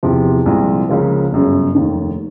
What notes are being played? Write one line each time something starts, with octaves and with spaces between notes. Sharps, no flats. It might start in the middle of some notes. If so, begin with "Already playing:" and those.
E2 C3 F3
C2 A#2 F3 G#3
C#2 C#3 F3 A#3
G1 F#2 C#3
F1 D#2 D#3